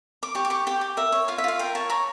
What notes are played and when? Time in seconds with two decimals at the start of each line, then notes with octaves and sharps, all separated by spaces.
0.23 D6
0.35 G4 C#6
0.45 D6
0.50 G4 C#6
0.67 G4 G5
0.81 G4
0.97 A#4 E5
1.12 C#5
1.28 F4 F5
1.38 E5
1.44 F4 F5
1.59 A#4 G5
1.75 C#5 A5
1.90 C#5 A#5